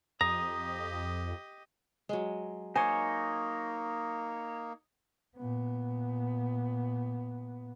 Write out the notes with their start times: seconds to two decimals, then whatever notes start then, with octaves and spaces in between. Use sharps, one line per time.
0.21 F2 G4 D#5 A#5 D#6
2.09 F#3 G#3
2.76 A#3 D#4 C5 C#5 G#5
5.38 A#2 B3